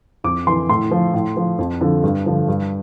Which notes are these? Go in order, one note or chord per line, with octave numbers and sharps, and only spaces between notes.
F2 D6
E3 C6
A2 C6
F3
A2
F3
F2
D3 F3
G2
D3 F3
G2